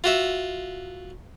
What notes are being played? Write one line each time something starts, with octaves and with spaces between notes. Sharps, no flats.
F4 F#4 E5